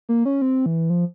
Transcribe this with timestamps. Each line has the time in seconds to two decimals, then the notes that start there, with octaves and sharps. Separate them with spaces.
0.09 A#3
0.25 C#4
0.42 C4
0.66 E3
0.90 F3